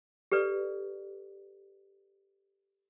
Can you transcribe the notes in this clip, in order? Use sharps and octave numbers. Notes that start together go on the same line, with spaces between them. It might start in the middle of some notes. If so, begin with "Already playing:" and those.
G4 A4 B4 D5